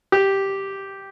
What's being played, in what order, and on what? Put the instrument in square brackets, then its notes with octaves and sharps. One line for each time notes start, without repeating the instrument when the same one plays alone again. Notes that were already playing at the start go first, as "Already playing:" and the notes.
[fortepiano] G4